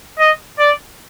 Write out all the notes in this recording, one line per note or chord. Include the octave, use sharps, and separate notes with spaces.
D#5
D5